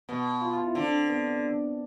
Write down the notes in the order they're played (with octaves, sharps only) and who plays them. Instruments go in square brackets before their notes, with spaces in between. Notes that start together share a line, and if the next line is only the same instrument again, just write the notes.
[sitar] B2 [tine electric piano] B3
[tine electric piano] F4
F4
E4
[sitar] D3 [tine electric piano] C4
[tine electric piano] B3